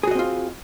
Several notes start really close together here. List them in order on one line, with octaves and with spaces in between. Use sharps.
G#4 F#4 D#5 C4 F4